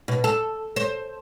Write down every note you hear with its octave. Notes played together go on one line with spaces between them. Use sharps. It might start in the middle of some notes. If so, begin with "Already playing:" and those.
B2
A4
C5